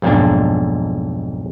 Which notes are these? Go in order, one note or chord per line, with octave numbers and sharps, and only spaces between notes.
B1 F2 G#2 A#3 D4